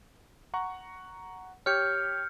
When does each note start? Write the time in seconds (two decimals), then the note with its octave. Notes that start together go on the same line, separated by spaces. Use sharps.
0.54 F#5 A#5 C#6
1.66 G4 C#5 F6 G6 C#7